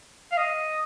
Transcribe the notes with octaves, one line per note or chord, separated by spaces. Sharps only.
F5
D#5